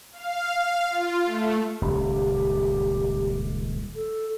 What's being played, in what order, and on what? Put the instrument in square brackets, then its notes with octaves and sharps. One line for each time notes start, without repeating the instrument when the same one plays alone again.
[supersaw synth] F5
F5
F4
A3
[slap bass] D#1 C#2 [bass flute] G4
[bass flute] A4